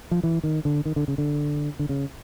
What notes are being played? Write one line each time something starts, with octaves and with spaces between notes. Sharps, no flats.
F3
E3
D#3
D3
D#3
D3
C#3
D3
D3
C#3